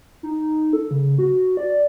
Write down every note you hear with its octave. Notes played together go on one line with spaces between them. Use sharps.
D#4
A4
C#3
F#4
D5